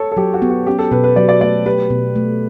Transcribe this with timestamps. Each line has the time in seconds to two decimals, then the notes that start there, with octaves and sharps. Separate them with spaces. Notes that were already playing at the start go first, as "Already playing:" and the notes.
Already playing: A4 C#5
0.12 A4
0.17 F#3 G4
0.34 F#4
0.42 B3
0.50 F#4
0.67 C#4 G4
0.79 A4
0.91 B2 B4
1.04 B4
1.16 F#3 D5
1.29 D5
1.41 A3 D5
1.66 G4 B4
1.90 B2
2.16 A3